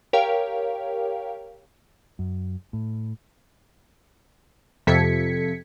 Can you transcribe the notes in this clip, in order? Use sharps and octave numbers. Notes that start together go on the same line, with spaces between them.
G4 A#4 C#5 F5 G5
F#2
A2
F2 C3 A4 G#6 B6 C#7